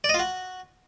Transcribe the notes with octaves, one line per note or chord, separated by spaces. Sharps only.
D5
D#5
F4
F#4